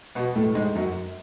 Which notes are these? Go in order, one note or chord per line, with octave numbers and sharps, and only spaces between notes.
B2 B3
A2 A3
G#2 G#3
F#2 F#3